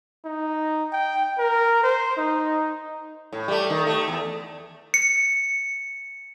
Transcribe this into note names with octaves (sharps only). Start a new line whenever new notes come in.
D#4
G5
A#4
C5
D#4
A2
G3 A3
D#3
A3
E2
C#7